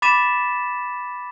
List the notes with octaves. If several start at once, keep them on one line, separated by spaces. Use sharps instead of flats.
B5 D6 A6 B6 D#7 E7